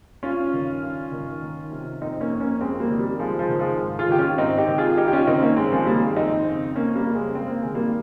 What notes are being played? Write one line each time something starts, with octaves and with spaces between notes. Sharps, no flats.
G2 C#4 F4
D#3
G2
D#3
D#3
C3
F2 C4 D#4
A#3 C#4
F2
A#3 C#4
F2 G#3 C4
G3 A#3
D#3
G3
F2 F3 G#3
F3 G#3
D#3
F3 G#3
G#2
F4 G#4
D#3 G4
C#4 F4
G#2 C4 D#4
D#4 G4
D#3
F4 G#4
G2 D#4 G4
G4
C#4 F4
D#3 C4 D#4
A#3 C#4
G2 G#3 C4
F3 G#3
D#3 G3 A#3
G#3 C4
F2 C4 D#4
C#3
F2 A#3 C#4
G3 A#3
C#3
G#3 C4
G2 C4
A#3
D#3 G#3
G3 A#3